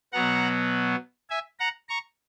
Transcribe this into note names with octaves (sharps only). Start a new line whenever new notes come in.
B2 F#3 B3 F#5 A#5
E5 G#5
F#5 A#5
A#5 C#6